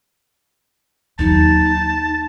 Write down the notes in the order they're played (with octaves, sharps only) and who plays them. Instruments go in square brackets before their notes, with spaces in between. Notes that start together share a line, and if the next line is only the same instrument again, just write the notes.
[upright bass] D#2 F#3 [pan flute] D#4 [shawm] A5